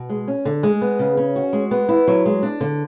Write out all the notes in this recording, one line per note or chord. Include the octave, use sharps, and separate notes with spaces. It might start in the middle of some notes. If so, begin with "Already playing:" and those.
Already playing: B2
G#3
C#4
D3
G#3
B3
C#3
C#4
F#4
G#3
B3
E4
F#3
G#3
D4
D3